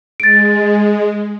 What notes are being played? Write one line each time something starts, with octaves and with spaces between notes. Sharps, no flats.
G#3 A6 D7